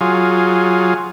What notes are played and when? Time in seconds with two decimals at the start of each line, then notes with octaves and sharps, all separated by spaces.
0.01 F#3 F4 G#4